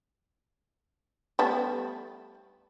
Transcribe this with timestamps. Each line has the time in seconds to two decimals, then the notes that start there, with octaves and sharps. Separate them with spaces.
1.39 G3 A3 B3